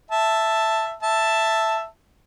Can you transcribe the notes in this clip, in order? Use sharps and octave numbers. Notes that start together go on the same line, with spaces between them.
E5 A5
E5 A5